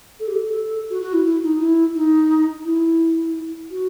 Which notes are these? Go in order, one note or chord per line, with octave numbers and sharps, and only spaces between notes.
A4
G4
A4
F#4
F#4
E4
E4
D#4
E4
D#4
E4
F#4